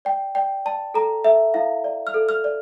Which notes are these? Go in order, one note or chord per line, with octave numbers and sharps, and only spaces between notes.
D5 G5
D5 G5
D5 A5
A4 A#5
A4 E5
E4 F5
D5
F6
A4
F6
D5